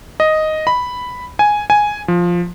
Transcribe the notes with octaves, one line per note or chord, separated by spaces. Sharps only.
D#5
B5
G#5
G#5
F3